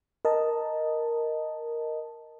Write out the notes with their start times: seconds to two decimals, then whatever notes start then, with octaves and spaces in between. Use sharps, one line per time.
0.25 A#4 D#5 A5